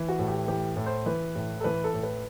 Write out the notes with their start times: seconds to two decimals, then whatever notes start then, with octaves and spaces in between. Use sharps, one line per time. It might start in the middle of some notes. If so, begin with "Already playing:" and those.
Already playing: E3
0.08 F#4
0.19 A2
0.28 G4
0.48 E3 G4
0.76 A2
0.86 C5
1.06 E3 B4
1.35 A2
1.60 A4
1.64 E3 B4
1.84 A4
1.94 A2
2.03 B4